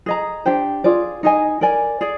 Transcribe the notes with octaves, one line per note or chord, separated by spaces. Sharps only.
G#4 D#5 A#5
D4 G4 C5 G5
F4 G#4 D5
D#4 G#4 D#5 G#5
A#4 D5 G#5
G#4 D5